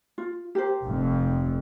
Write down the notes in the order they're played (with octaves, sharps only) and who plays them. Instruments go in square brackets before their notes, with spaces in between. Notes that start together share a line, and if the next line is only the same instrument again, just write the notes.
[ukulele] F4
G4 A#4 C5
[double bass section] F1 F2